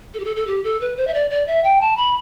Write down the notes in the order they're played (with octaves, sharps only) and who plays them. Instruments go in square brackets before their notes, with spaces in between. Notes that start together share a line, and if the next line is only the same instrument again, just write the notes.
[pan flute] A4
G4
A4
A4
G4
A4
B4
C5
E5
D5
D5
E5
G5
A5
B5